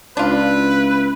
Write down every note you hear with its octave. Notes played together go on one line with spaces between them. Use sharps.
C#2 D4 E4 F4 B4